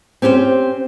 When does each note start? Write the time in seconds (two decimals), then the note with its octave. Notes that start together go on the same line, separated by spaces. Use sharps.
0.22 C4 C#4 G4 B4 C5